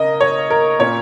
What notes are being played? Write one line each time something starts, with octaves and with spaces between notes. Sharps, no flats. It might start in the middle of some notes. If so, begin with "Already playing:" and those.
Already playing: C#3 A#3 A#4 D#5
C#5
A#4
A#2 A#3 C#4 C#5